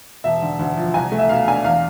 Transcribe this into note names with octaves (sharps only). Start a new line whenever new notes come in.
E1 E5
D3
D2
F3
C2 G#5
A3
E5
B2 F5
D4 G#5
E2 F5